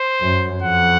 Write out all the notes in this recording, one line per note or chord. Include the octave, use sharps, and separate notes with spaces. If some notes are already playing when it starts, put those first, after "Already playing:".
Already playing: C5
F#2
F2 F#5